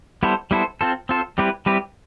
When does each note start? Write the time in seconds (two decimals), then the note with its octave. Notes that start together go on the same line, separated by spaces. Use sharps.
0.23 G3 B3 E4 A4 C5
0.51 G3 B3 E4 A4 C5
0.81 C4 F4 A4 C5
1.09 C4 F4 A4 C5
1.38 G3 C4 E4 G4 B4
1.66 G3 C4 E4 G4 B4